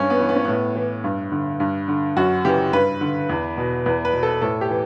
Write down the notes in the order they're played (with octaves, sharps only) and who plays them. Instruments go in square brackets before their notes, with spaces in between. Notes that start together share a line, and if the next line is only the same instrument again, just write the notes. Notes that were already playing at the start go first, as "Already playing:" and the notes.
Already playing: [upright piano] G2 C#4
B3
E3
B3
C#4
A2 B3
E3
G2
D3
G2
D3
F#2 F#4
C#3 E3 G4
G2 B4
D3
E2
B2
E2 B4
B4
B2
A4
A2 A4
G4
E3